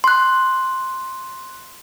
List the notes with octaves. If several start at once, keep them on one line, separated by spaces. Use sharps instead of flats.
C6 F#6